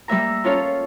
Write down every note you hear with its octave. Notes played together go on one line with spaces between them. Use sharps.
G3 A#3 E5 A#5
C#4 F4 A4 C#5 F5